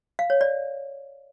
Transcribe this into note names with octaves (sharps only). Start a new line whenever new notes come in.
F5
C#5
D5